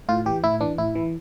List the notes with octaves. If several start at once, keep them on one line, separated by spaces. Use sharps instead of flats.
A2 F4
E3 G4
A2 E4
E3 D4
A2 E4
E3